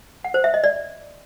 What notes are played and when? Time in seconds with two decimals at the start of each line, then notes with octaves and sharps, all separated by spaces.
0.24 F#5
0.34 C5
0.44 E5
0.54 D#5
0.64 D5